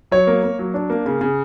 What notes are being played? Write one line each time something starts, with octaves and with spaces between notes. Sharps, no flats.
F#3 C#5
A#3
A#3
F#3
D4
A#3
C#3
C#3